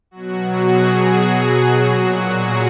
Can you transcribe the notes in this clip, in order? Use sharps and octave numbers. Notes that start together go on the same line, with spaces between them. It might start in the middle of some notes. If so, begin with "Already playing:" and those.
B2 F#3 F#4
G#4
A#2 F#3 F#4
G#4